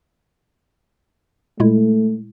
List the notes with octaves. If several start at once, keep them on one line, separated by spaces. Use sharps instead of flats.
A#2 G#3 A3 E4